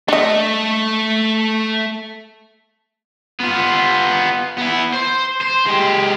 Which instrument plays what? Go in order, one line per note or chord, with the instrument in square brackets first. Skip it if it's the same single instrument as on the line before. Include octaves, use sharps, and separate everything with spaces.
[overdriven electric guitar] A3 [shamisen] D4 D#5
[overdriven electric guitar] B3 F4
B3 E4
C5
C5
G#3 G4